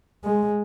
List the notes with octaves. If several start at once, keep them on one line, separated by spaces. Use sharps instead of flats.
G#3